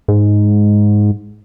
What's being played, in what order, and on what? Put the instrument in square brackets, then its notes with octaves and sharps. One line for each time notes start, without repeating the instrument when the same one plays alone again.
[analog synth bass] G#2